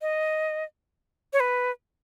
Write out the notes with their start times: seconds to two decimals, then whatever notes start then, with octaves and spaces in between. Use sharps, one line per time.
0.02 D#5
1.33 C#5
1.40 B4